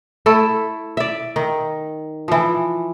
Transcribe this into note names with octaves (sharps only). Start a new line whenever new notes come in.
A3 E4 A4
D5 E5
D#3
E3 F3